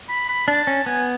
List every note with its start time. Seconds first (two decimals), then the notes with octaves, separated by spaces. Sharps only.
0.09 B5
0.29 B5
0.48 D4 A5
0.67 C#4
0.86 B3 G#5